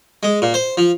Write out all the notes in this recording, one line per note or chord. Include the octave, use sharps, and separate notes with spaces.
G#3
A#2
C5
F3